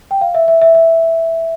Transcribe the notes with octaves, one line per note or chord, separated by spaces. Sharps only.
G5
F5
E5
E5
E5
E5